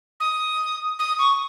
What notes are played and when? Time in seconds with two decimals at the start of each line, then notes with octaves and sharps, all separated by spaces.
0.20 D#6
0.99 D#6
1.19 C#6